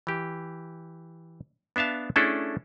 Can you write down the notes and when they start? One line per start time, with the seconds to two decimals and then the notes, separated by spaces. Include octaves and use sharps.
0.07 E3 G4
1.76 B3 D4 E5 F5 A5
2.16 A3 C#4 D4 E4 G#4 A4